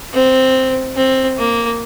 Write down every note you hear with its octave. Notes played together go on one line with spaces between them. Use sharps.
C4
C4
A#3